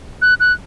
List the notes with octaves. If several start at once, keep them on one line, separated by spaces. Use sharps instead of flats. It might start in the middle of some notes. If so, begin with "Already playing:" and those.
F#6
F#6